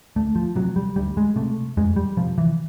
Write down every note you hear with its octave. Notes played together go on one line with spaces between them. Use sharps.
D2 A3
F3
C3 F#3
G3
D2 G3
G#3
C3 A3
F2 G#3
G3
C3 F3
E3